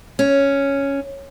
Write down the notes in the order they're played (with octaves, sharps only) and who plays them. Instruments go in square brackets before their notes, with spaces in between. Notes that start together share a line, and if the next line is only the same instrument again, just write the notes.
[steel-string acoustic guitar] C#4